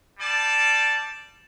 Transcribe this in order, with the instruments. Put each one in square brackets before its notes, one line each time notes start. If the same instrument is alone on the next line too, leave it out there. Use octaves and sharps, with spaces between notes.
[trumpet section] G3 D5 A5